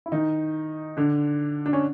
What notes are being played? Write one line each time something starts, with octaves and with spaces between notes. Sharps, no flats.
E4
D#3 D#4
D3 D4
D4
C#4